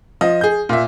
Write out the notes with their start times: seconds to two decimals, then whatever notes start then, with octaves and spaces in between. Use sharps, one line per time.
0.21 F3 D#5
0.41 G#4 G6
0.69 A#2 E5